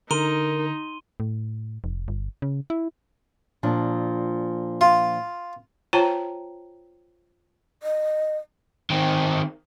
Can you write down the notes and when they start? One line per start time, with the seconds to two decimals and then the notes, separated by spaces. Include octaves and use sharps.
0.11 D3 D#4 A#4 C6 D#7 G7
1.20 A2
1.84 F1
2.08 G1
2.42 C#3
2.70 E4
3.63 A#2 F3 D4
4.81 F4
5.93 F4 C5 C#5 G5 A5 A#5
7.83 D#5
8.90 D#3 C4